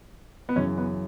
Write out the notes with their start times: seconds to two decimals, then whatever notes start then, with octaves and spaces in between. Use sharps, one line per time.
0.49 B3
0.56 F#2 C#3 E3 C#4
0.78 B3